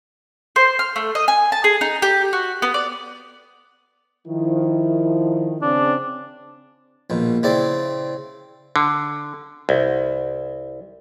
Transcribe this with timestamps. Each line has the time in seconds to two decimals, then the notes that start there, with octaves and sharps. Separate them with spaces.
0.56 C5
0.79 F6
0.96 A3
1.15 D#5
1.28 G#5
1.52 A5
1.64 G#4
1.81 D#4
2.02 G4
2.33 F#4
2.62 B3
2.74 D5
4.28 D#3 F3 E4
5.62 C#3 C4 D4
7.10 A#1 B2
7.43 C#3 C4 E4 D5
8.76 D3
9.69 C2